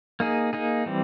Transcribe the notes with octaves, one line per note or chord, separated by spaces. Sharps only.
A#3 D#4 G#4
A#3 D#4 G#4
E3 G3 C4